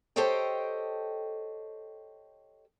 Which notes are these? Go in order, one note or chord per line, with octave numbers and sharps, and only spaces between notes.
G4 A4 C5 C#5 D#5 G5